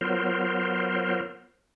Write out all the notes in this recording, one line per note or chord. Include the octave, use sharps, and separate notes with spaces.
F#3 B3 F4 A#4 C5